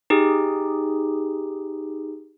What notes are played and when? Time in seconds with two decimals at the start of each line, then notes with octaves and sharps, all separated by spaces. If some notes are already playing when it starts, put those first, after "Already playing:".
0.10 D#4 G4 G#4